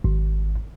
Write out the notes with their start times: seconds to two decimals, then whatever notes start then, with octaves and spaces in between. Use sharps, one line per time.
0.04 G#1